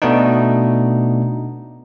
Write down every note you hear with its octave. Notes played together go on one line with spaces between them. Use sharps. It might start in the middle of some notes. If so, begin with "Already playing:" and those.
B2 A3 B3 D4 D#4